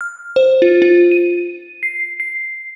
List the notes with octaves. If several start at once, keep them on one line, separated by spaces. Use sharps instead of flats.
F6
C5
F4
F4
D#7
C7
C7